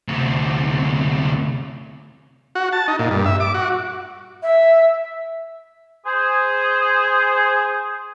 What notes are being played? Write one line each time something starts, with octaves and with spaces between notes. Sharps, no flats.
D2 C3
F#4
A5
D#4
A#2
G2
E5
D6
F#4
E5
G#4 C5